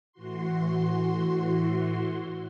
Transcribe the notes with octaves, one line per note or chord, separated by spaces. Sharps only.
A2 E3 F#4 C6